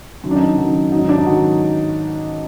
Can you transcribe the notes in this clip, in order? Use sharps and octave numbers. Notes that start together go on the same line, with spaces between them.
F#2 D#3 F#3
D4
D#4
F#2 D#3 F#3
G#2 D#3 F#3 D#4
D4
D#4
D#3 F#3 F#4